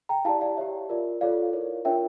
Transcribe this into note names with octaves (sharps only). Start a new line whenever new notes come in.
G5 A#5
E4 G4 D5 F5 A5
D5 F5
G4 C#5 E5
F4 A#4 D5
F4 A4 C#5 D5 F5
E4 A#4 C#5
D4 F4 A#4 C#5 E5 G5